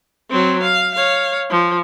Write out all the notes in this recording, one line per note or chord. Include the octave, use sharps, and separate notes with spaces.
F#3 C4
F5
C#5 F5
F3